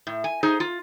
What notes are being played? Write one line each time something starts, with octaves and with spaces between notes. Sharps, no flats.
A2
G#5
D#4 G#4 C5
F4